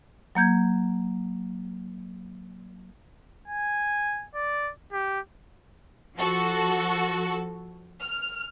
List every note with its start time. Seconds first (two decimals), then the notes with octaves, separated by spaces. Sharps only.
0.35 F#3 A#3 G6 G#6
3.48 G#5
4.35 D5
4.93 G4
6.16 F3 F#4 A4
8.02 F6